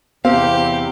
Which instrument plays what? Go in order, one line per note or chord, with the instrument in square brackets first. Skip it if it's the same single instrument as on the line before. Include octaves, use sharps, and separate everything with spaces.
[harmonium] E2 C3 [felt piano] C4 [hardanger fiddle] G4 [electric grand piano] F5